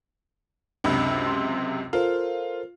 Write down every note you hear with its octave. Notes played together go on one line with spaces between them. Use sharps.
C#2 F#2 C3 D4 B5
C6
F4 A4 A#4 C5